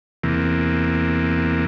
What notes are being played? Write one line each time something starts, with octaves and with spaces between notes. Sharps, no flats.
E2 C3 E3 A#3